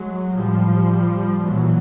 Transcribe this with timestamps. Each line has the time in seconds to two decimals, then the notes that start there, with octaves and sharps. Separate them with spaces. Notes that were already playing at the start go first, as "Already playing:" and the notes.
Already playing: F#3 G#3
0.34 A2 F3 G3
1.43 A#2 E3 F#3